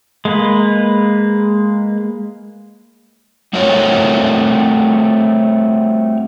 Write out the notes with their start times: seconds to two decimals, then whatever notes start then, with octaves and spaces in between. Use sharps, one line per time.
0.25 G#3 A#3 B4
3.53 G3 A3 C4 F#4 A#4 C#5